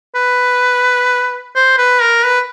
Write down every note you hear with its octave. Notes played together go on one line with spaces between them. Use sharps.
B4
C5
B4
A#4
B4